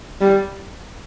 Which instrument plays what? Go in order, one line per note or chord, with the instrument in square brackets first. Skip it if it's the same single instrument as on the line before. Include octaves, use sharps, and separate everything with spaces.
[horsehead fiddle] G3